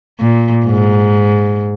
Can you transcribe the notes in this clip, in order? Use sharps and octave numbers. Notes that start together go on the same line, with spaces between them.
A#2
G#2